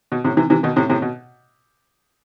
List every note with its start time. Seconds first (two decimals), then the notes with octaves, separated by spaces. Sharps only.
0.12 B2
0.25 A2 C3
0.37 C3 E3
0.50 C3 E3
0.63 B2 D#3
0.76 A2 C3
0.90 A2 C3
1.02 B2